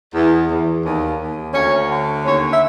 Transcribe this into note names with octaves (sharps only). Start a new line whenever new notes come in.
E2
E2
D#2
D#2
D2 C#4 C#5
D3
D#2 C#4 C#5
E5